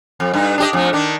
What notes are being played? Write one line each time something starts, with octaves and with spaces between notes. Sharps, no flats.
F2
G2 D#4
D4 G4 D#5
F2 A3
D#3 D4